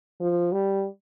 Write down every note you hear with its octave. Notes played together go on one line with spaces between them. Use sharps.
F3
G3